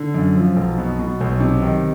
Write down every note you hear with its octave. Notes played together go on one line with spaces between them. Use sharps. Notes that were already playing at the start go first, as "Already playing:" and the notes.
Already playing: D3
F#2
F3
B1
B2
B2
B1
C3
D#3